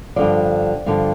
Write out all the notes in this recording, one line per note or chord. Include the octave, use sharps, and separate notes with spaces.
G2 D3 F3 D5
G2 D3 F3